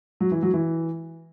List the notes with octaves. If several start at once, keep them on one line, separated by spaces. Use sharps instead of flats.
F#3
E3
F#3
E3